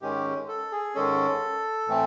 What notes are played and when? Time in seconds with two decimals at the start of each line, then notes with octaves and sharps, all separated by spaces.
0.02 G#2 D#3 G#3 C#4 G4
0.48 A4
0.72 G#4
0.95 G#2 D#3 G#3 C#4 A4
1.87 A2 E3 A3 C4